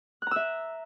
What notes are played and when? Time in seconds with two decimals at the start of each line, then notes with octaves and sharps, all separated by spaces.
0.22 F#6
0.27 A#5
0.31 E6
0.36 E5